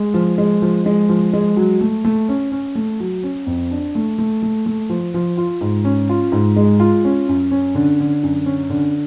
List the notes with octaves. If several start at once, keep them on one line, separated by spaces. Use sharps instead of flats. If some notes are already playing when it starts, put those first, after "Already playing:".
Already playing: G#3
F3
G#3
F3
G#3
F3
G#3
F#3
A3
A3
C#4
C#4
A3
F#3
C#4
F2
D4
A3
A3
A3
A3
F3
F3
F4
G#2
C#4
F4
G#2
G#3
F4
C#4
F#2
C#4
D3
D3
F#2
C#4
D3